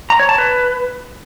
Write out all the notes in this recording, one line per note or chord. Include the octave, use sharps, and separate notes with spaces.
A#5
C#5
A5
B4